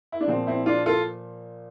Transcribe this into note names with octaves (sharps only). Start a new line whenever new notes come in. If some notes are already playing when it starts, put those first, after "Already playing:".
E4
D4
A#2 F3 C4
C4 E4
D4 F4
F4 A4